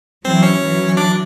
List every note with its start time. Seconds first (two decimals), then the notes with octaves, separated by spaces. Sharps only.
0.25 E3 F#3 C4 C5
0.42 C#4 C#5
0.61 E3 F#3
0.97 D4 D5